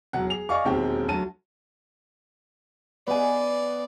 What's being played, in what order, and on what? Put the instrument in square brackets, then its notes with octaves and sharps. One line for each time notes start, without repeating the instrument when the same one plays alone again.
[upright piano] E1 F#3 F#5
G#4 F7
D5 D#5 F5 G#5 C#6
E1 D#2 G#3 C4 G4 G5
D2 F#3 A5 D#7
[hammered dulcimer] B3 G#5 [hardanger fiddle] D5